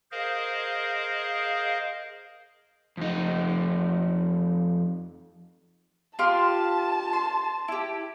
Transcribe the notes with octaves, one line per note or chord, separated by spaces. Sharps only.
G#4 A#4 C5 D#5 F5
F2 D#4
F4 G4 A5 C6
C6
E4 G4